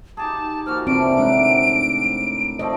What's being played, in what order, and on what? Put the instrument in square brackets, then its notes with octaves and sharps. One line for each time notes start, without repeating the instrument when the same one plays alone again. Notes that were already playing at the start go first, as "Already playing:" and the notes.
[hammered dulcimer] D#4 G4 G#4 [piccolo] A5
[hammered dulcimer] F3 A#3 F#4 [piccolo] F6
[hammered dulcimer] D3 E3 G3 [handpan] C4 [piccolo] D7
[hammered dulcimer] A2 D#3 F#5 [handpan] G#3 D4
[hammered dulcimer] D3 F3 A3 [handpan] D#5